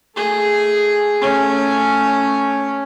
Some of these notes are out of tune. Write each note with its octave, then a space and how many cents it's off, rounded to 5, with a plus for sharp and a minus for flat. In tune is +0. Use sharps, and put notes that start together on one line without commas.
A3 +10 G#4 +0
A3 +0 C#4 +0